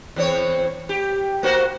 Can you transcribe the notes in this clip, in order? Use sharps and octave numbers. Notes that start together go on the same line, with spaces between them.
E2 C4 C#5
G4
A#3 F#4 C5